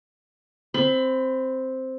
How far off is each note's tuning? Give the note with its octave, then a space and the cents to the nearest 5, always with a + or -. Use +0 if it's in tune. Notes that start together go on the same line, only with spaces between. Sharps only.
C4 +0 B5 +25